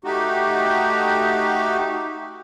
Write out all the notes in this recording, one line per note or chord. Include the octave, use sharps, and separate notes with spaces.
A3 D#4 F#4 G4